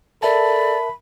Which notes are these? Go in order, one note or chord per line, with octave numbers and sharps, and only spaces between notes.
A4 A#4 D5 E5 A5 B5